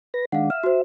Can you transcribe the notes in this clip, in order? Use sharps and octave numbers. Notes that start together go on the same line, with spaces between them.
B4 A#6
D#3 G#3 D4 F5 F#5
E5 F6
F#4 C5